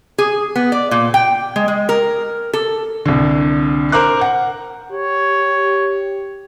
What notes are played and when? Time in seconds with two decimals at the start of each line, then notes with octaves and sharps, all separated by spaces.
0.18 G#4
0.56 B3
0.72 D5
0.91 A#2
1.14 G5
1.56 G#3
1.68 G#3
1.89 A#4
2.53 A4
3.06 C2 D3
3.92 A#4 C5 A#5 D6 F#6
4.21 F#5
4.92 G4 C#5